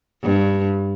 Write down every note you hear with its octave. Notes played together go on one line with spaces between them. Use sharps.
G2